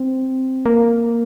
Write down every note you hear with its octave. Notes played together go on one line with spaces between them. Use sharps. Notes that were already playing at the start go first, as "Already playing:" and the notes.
Already playing: C4
A#3